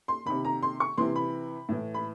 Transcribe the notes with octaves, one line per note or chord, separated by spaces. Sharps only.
C6
C3 D#3 B5
A#5
C6
C#6
C3 E3 C6
B5
A2 E3
B5